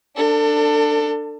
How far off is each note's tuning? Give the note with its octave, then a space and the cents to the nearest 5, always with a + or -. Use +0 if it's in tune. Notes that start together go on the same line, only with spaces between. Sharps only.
D4 +10 A4 +30